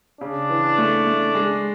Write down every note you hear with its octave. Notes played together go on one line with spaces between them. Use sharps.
C#3 D4
E3
A3
A3
G#3